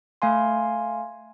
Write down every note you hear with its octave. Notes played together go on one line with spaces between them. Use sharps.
A3 F5 G#5 C6